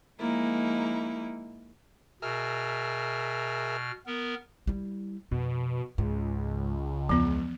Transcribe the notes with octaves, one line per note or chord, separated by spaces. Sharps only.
F3 G#3 A#3 D#4 E4
B2 G#4 A#4 E5 F6
B3 A#4
G3 E4
F2 B2
C#2 G#2
E2 F3 B3